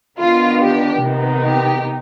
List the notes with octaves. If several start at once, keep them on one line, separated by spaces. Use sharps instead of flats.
D#3 B3 D4 F4
G4
C3 D#3 B3 D#4
G4